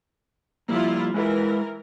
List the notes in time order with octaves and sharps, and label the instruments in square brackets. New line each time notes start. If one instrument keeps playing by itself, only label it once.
[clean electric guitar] F3 G3 A#3 [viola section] E4 F4
[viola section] E3 A#4 [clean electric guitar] G#3 E4 B4